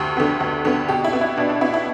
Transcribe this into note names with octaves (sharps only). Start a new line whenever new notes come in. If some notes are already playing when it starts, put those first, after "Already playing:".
Already playing: D2 G4
D3 B3
D2
D3 B3
B2 G4
E4
B3
E4
B2 D4
D4
B3 E4
E4